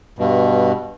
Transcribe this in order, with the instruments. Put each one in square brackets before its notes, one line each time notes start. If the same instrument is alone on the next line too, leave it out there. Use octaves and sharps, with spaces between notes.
[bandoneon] G2 B2